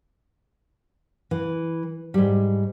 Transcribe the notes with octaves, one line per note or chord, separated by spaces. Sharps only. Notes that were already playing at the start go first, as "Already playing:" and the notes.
E3
G#2 G3